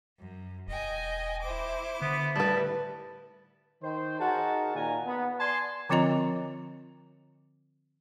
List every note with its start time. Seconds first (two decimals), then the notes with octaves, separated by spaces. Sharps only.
0.17 F#2
0.67 E1 D#5 G5 G#5
1.42 E4 C5 D6
2.02 D3 B3
2.36 A2 G3 E4 B4 A5
3.82 D#3 C5
4.19 D#4 F#4 G#4 A#4 A5
4.75 A#2 D#3 G#5 A#5
5.05 B3
5.39 D5 G#5 A5 C6
5.89 D3 F3 C4 F4 D#5 A#5